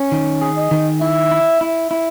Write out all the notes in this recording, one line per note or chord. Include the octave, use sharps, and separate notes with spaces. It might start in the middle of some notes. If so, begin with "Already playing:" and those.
Already playing: C#4
D#3
G#4
D#5
D#3
E4 E5
E4
E4
E4